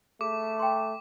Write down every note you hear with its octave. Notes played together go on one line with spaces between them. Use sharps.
A3 G#4 D6
G5 C6